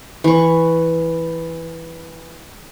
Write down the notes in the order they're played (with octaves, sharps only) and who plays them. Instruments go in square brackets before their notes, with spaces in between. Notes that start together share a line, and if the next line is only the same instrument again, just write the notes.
[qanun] E3 C#6